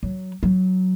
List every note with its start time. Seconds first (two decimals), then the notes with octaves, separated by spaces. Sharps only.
0.03 F#3
0.43 F#3